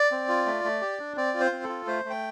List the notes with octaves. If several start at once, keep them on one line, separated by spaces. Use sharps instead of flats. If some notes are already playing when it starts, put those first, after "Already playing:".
Already playing: D5
C4
F4
A3
A3
G4
D4
C4 D5
F4
C5
C4
A4
F4
A3 C5
A3
G5